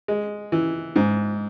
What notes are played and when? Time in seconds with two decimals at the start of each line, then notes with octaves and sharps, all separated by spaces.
0.08 G#3
0.52 E3
0.96 G#2